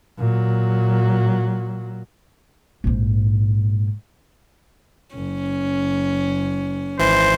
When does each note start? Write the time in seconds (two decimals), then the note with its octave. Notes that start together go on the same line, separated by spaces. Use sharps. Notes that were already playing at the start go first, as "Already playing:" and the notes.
0.19 A#2 F#3
2.84 A#1 G#2
5.15 F#1 C#4
7.00 G#1 E3 C5